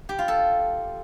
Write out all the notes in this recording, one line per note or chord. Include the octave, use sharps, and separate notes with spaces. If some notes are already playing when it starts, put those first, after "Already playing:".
G4
F4
A4